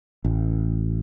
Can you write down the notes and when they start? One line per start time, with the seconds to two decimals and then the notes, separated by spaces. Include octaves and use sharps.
0.25 A1